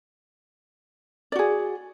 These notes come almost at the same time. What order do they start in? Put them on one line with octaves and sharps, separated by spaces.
D5 F#4 G#4